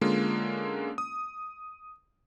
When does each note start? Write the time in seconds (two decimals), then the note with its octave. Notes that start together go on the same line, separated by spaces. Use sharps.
0.01 D3 G#3 A#3 C#4 F4
0.98 D#6